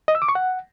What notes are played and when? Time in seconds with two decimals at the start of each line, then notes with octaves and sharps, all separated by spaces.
0.08 D#5
0.15 E6
0.22 D6
0.29 C#6
0.35 F#5